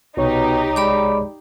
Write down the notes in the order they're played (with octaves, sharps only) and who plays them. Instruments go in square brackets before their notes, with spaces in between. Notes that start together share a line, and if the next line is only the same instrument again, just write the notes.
[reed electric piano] C2 C#5 [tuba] B2 [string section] D#4 G4
[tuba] G#3 [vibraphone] D5 B5 D6